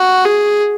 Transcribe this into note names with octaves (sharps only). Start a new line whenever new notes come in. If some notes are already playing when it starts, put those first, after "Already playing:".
Already playing: F#4
G#4